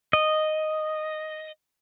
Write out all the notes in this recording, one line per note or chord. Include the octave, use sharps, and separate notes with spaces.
D#5